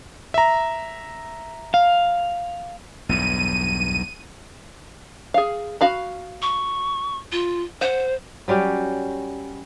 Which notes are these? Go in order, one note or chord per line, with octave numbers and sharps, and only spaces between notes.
E5 A#5
F5
B1 E2 G2 D#7
G#4 F5
F#4 F5 B5
C#6
F4
C5 F#5
F#3 G3 C#4 G4